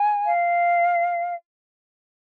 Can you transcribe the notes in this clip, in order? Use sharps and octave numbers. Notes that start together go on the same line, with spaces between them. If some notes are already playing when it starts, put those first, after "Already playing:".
Already playing: G#5
F5